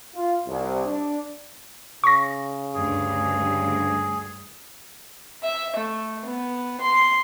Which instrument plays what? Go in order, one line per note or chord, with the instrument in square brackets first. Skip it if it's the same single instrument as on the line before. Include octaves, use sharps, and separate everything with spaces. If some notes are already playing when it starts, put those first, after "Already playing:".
[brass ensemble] F4
C2
D4
[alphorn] C#3 [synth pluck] C#6 A#6
[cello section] D2 G2 [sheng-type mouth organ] G#4
[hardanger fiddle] E5
A3
B3
C6